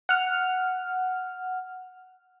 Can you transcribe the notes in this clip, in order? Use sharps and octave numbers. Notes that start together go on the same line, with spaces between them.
F#5 F6